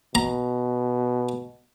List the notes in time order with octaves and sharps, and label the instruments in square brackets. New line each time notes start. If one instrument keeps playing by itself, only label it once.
[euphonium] B2 [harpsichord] A#5